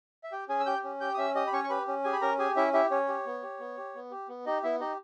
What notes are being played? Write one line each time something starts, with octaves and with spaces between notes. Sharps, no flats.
E5
G4 G5
C#4 G#4 G#5
E6
G4 G5 G6
C#4
G4 G5 G6
D#6
C#4 E5 E6
G4 D#5 D#6
B5
C#4 C#5 C#6
C#6
G4 B4 B5
C#4
G4 G#4 G#5
B5
C#4 A#4 A#5
G4 G#4 G#5
C#4 E4 E5
E4 G4 E5
C#4 C#5
G4
B3
G4
B3
G4
B3
G4
B3
D#4 G4 D#5
B3 E4 E5
D#4 G4 D#5